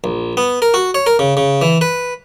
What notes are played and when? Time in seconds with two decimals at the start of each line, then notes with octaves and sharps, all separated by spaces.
0.04 A#1
0.37 B3
0.62 A#4
0.74 F#4
0.94 C#5
1.07 A#4
1.19 C#3
1.37 C#3
1.62 E3
1.81 B4